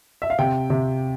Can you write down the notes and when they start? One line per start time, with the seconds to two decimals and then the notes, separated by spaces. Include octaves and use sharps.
0.22 E5
0.30 F5
0.39 C3 G5
0.70 C3